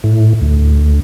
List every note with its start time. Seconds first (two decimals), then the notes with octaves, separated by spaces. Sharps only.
0.04 A2
0.41 D2